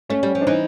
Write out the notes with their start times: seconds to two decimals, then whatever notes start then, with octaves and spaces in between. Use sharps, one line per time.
0.10 A3 C#4
0.23 G3
0.35 F3
0.41 D4
0.47 E3 D#4